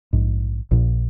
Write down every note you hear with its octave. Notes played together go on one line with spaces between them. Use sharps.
A#1 G#2
A#1 A#2